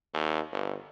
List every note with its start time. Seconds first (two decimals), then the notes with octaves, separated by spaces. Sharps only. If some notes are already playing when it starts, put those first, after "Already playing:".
0.14 D#2
0.52 G1